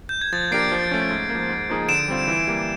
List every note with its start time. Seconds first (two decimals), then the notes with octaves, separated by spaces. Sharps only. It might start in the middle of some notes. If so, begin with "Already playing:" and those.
0.09 G6
0.21 G#6
0.32 F3 A6
0.51 A#3 D4 G4 A#4 C7 D7
0.72 F3
0.91 A3 C#4
1.11 G#2
1.30 A#3
1.35 F3
1.49 G#2
1.70 F3 A#3 D#4 G#4
1.89 D3 D7 E7
2.08 G3 C4 F4
2.28 E3
2.48 G3 A#3